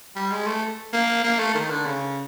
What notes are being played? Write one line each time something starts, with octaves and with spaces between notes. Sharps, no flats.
G3
G#3
A3
A#3
A#3
A3
D#3
D3
C#3